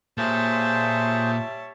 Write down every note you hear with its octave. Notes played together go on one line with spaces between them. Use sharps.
A#2 G3 A#3 G#4 C5 C#5 E5 A5